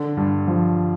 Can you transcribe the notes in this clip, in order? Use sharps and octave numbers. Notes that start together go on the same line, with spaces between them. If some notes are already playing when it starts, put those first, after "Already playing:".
Already playing: D3
G2
F3